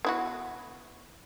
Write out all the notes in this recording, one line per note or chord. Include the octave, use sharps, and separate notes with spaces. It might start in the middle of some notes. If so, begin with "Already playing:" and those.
B3 E4 F#4